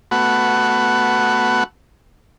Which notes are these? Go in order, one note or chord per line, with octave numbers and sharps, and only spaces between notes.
A3 B3 F#4 F#5